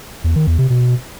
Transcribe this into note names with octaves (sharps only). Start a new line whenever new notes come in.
E2
D#3
E2
C3
B2